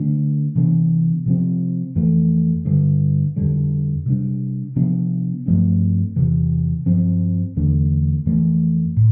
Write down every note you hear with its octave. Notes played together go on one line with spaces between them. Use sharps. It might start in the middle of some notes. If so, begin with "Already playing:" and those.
Already playing: D3 A3 D4
C3 E3 B3 D4
C3 F3 C4
F2 E3 A3
G2 D3 G3
F2 D3 G3
C3 G3 D4
C3 F3 B3 D4
G2 F3 A3 C4
E2 C3 E3
G2 F3 C4
E2 D3 A3 D4
F2 E3 A3
A2